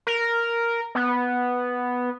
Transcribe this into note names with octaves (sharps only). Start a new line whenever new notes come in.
A#4
B3